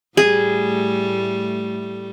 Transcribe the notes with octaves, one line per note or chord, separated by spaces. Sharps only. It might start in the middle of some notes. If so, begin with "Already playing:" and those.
A2 G3 A3 G#4